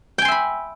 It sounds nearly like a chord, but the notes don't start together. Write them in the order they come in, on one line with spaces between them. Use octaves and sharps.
G5 G#5 C6 E5 B5